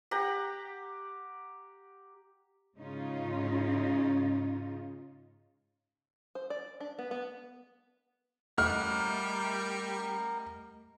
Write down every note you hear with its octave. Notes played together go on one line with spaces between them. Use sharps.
G4 F#5 A#5
G#2 C#3 C#4 D#4 F4
C5
D5
D4
B3
B3
G3 A3 A#4 D#5 F#5 F6